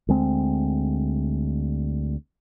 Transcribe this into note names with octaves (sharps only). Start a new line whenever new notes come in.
D2 G#3 C4